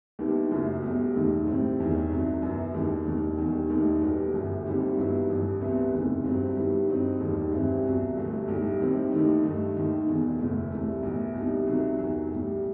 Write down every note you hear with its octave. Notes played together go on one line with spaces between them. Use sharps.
D#2 D#3 G3 B3 E4
F#1 F#2 F#3 A3
B1 B2 G3
E1 D#2 D#3 A3
A2 G3 C4 E4
E1 E2 D#3
C2 C3 D#3 F#3
F#2 F#3 B3 E4
E1 D#2 D#3
E1 D#2 D#3
E1 E2 D#3 G3
E1 D#2 D#3 A3 D#4
B1 B2 G3 B3
G1 F#2 E3 G3
D#2 D#3 G3 C4 E4
G2 D#3 F#3 B3 E4
A1 G2 F#3
C2 C3 E3 B3
F#1 E2 C3 D#3 A3
G2 F#3 C4 E4
G2 D#3 G3 B3 E4
G2 F#3 C4 D#4
E1 D#2 D#3 G3
G2 E3 G3 C4
C2 B2 F#3
G1 G2 E3 A3
B1 A2 G3 D#4
D#2 D#3 G3 C4 E4
D#2 D#3 A3 D#4
G2 D#3 A3
D#2 D#3 A3 D#4
E1 E2 B2
F#1 E2 B2 A3 E4
C2 C3 E3 A3
B1 A2 E3
C2 B2 G3 D#4
C2 C3 D#3 F#3
E2 D#3 F#3
B1 A2 G3